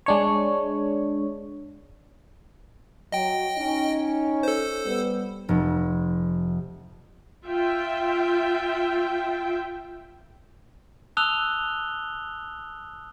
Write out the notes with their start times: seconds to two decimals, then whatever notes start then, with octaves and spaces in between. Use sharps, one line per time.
0.06 G#3 D4 C#5
3.12 F#3 D#5 G5
3.58 C#4 D#4
4.43 A4 C5
4.85 G3 B3
5.49 F1
7.43 F4 E5 G5
11.17 A5 D#6 E6 F#6 F7 G7